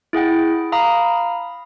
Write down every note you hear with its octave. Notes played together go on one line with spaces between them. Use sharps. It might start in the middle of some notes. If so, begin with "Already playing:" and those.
E4 G#4 F#5 G5
F5 A#5 B5 D#6